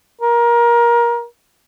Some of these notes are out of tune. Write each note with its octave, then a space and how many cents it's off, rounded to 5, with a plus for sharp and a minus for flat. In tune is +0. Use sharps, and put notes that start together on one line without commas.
A#4 +25